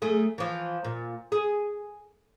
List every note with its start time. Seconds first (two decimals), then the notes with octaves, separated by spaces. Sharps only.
0.02 F#2 A3 G#4
0.38 E3 F3
0.85 A#2
1.32 G#4